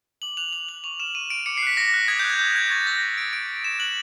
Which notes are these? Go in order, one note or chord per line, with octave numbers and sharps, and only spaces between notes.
D6 F#7
F#6 F7
D6 F#7
F#6 F#7
C#6 F7
F6 E7
C#6 D#7
F6 D7
D6 C#7
C7
F#6 B6
D6 A#6
F#6
D#6 G#6
G6
F#6
G#6
D#6 G6
F#6 G#6
C#6 A6
E6 G6 A#6
C#6 A#6
E6 G6 D7
D6 D7
F#6
D6 E7
F#6 F#7